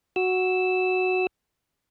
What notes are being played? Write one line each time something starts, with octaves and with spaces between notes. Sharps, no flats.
F#4 E6